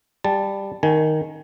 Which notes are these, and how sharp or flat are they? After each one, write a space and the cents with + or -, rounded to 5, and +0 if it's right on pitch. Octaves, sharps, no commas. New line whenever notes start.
G3 +10 A5 +0
D#3 +0 G#5 +20